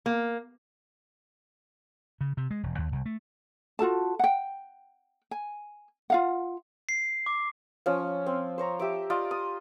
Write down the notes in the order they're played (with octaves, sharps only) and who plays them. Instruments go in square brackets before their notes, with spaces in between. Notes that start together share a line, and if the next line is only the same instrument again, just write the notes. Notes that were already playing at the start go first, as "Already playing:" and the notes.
[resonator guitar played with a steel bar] A#3
[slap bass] C#3
C3
G#3
E1
D#2
C2
A3
[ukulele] F4 F#4 A4 A5
F#5 G5
G#5
F4 F5 F#5
[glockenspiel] C7
D6
[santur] F3 C#4 C#6
C4
C5 C#5 A#5
G4 E5 D6
F4 D5 D#5
D#6